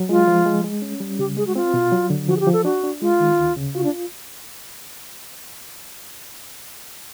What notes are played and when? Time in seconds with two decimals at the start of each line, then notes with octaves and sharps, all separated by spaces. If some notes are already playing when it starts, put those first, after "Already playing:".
Already playing: F#3
0.09 G#3 F4
0.28 F3
0.46 G#3
0.64 G#3
0.82 C#4
1.00 G3
1.19 C#3 G4
1.37 G#3 G#4
1.47 F#4
1.56 C4 F4
1.74 B2
1.92 F#3
2.10 D3
2.28 F3 F#4
2.37 G#4
2.40 G4
2.47 F3
2.53 A4
2.65 D4 F#4
2.84 D4
3.02 G#3 F4
3.20 D#3
3.38 D2
3.56 C#3
3.75 F4 F#4
3.84 D4